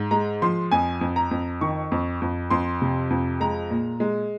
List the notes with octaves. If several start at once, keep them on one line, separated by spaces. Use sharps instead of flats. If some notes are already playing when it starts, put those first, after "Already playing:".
Already playing: G#2
G#3 A#5
F3 C6
F2 G#5
F2
A#5
F2
D#3 C#6
F2
F2
F2 C6
C3
F2
G#3 A#5
A#2
G#3